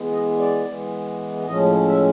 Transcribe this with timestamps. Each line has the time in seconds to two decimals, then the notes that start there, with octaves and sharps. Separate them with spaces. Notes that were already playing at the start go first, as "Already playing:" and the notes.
Already playing: E3 G#3 B3
0.11 D#5
0.38 D5
0.65 E3 G#3 B3
1.46 A2 F3 G#3 C#4 D#5
1.87 E5